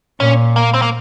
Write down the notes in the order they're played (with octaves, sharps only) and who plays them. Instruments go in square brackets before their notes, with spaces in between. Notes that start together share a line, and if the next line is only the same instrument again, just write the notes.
[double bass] A#2 [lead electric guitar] C#4
[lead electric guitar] A#3
C4
A#3